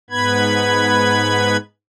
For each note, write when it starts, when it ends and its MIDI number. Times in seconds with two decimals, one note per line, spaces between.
0.10 1.57 44
0.10 1.57 59
0.10 1.57 71
0.10 1.57 83
0.10 1.57 92